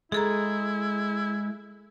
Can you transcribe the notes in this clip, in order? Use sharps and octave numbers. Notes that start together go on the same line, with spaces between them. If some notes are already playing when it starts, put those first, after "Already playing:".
G#3 E4 G#4 A4 A#5